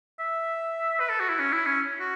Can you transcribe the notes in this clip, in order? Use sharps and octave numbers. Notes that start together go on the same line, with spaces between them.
E5
B4
A4
F#4
E4
C#4
E4
C#4
F#4